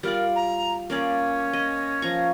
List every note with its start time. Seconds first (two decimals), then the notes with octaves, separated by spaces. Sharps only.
0.03 G3 F4 A#4 D5
0.36 A#5
0.90 A#3 C#4 D5
1.53 D#5
2.02 F3 A#5 C#6